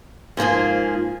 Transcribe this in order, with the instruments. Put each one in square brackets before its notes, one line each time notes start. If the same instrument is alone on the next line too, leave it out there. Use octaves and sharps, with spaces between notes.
[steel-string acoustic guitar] G#2 F3 A#3 F4 G#4